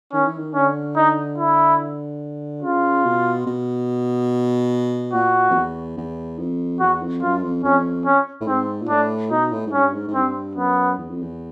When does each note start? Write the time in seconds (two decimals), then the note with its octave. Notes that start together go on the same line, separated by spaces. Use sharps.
0.13 D#3 C#4
0.25 E3
0.39 D#3
0.54 D3 C#4
0.96 D#4
1.38 E4
2.62 C#3 F4
3.05 B2
3.47 B2
5.13 A#2 F#4
5.50 F2
5.55 E2
5.97 E2
6.39 F2
6.80 E2 F#4
7.02 F2
7.22 F#2 F4
7.43 F2
7.64 F2 C#4
8.06 C#4
8.41 A2
8.47 G#2 C4
8.82 A#2
8.89 A2 D4
9.31 B2 D#4
9.52 A2
9.67 G#2
9.73 G2 C#4
9.93 G#2
10.08 G#2
10.14 G2 C4
10.56 F#2 B3
10.98 E2
11.10 F2
11.22 E2